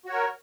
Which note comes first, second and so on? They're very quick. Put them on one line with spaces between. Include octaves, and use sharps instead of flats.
F#4 C#5 A#4